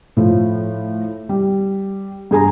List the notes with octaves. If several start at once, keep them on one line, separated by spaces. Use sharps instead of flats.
A2 F3
G3
G2 G#4 G#5 A#5